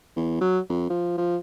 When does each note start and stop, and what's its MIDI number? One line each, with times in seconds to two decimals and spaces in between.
0.16 0.36 40
0.41 0.59 54
0.69 0.85 41
0.90 1.13 53
1.17 1.37 53